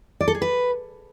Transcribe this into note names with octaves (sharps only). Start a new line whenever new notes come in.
D5
A4
G#4
B4